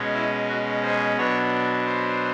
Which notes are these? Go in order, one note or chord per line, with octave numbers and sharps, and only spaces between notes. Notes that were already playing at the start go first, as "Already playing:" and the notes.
Already playing: B2 G#3 C#4
E4
F#4
C5
B2 F#3 B3 D4 C#5
C5